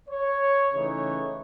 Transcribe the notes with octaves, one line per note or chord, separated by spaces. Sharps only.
C#5
C#3 E3 A3 D#4 C#5